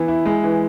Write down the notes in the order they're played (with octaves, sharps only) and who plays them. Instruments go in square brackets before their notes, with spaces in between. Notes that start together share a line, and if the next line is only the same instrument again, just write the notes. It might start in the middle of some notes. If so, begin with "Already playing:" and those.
Already playing: [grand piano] E3 B3
E4
G#3
E3